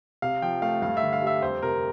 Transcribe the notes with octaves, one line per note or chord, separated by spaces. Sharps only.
C3 F5
F3 G5
A3 F5
G2 F5
E5
D3
F5
G3 E5
F2 C5
C3 A#4